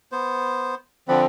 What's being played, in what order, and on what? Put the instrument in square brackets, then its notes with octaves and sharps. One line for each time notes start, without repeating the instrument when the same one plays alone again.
[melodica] B3 C5
[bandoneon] D3 F3 C4 [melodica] D5 F#5 B5